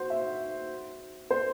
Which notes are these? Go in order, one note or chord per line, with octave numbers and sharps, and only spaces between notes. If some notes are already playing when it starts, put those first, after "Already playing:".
Already playing: F#4 C5
E5
C5